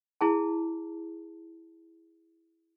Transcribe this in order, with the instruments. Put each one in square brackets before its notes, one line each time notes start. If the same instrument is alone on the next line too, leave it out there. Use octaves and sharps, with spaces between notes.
[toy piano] E4 G#4 A5